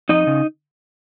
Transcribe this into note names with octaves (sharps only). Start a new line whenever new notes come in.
F2 D#4 D#5
C#3